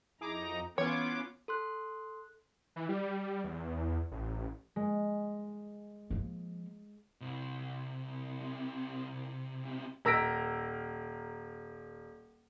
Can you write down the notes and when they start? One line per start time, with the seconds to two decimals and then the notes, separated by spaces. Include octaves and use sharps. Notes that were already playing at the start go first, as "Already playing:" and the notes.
0.21 F2 D#4 E4 G#4 A#5 D6
0.78 E3 B3 C#4 F4 C#5 C#6 D6 G#6
1.48 A4 C6 F#6
2.76 E3
2.89 G3
3.44 E2
4.11 A1
4.76 G#3
6.10 F3 A#3
7.21 C2 C3
10.05 D#1 A#4 E6 A#6 B6 D7